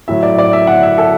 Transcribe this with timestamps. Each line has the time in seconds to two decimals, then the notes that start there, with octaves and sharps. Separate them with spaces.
0.08 A2 F#3 E5
0.23 D5
0.38 D5
0.53 E5
0.67 F#5
0.83 E5
0.98 A4